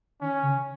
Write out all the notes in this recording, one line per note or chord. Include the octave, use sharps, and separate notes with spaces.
D#3 C#4
C#3